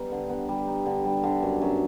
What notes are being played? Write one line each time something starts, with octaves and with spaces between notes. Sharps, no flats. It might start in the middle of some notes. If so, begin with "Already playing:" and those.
Already playing: G3 B3 D#4
D3
B3
G3
D#4
D3
G3
D3
F#2
F#2